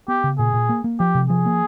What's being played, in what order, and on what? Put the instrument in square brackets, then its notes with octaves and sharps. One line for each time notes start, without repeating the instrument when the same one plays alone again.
[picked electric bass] B3 [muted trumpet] G4
[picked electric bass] C#3
[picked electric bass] A#2 [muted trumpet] G#4
[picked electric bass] A#2
A#3
A#3
[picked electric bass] F3 [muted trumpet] G4
[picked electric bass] C3
[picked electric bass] F3 [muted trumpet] G#4
[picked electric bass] A#3